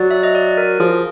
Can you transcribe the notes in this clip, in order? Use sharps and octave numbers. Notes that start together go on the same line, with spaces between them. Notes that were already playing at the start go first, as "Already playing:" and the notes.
Already playing: F#3 D5
E5
D#5
D5
A#4
F3 G#4